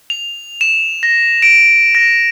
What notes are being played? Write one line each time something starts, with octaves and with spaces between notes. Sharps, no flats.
F7
E7
A#6
D7
A#6